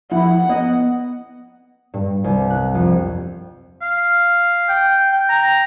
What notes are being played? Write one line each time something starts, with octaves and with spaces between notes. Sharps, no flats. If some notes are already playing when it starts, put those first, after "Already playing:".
F3 E4 F#5
B3 D#5
G2
C2
F#6
F2
F5
G5
G5
A#5